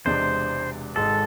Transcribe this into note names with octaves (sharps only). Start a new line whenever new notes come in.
E1 E2 C3 G#3 D4 C5
G#1 G#2 G#3 A4